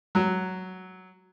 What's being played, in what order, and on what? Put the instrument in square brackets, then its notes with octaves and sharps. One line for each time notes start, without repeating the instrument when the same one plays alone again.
[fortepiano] F#3